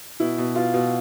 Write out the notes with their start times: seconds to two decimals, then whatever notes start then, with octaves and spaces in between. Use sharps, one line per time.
0.20 B2 E4
0.38 B2
0.56 B2 F4
0.74 B2